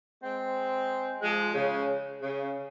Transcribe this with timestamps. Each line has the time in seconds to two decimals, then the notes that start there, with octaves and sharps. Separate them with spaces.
0.23 G#3 C4
1.21 F3 G#3
1.54 C#3
2.21 C#3